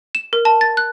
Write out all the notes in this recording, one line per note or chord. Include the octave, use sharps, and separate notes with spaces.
E7
A#4
A5
A6
F#6